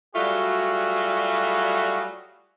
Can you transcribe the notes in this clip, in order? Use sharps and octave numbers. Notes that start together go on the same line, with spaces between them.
F#3 G3 A3 F4 F#4 G#4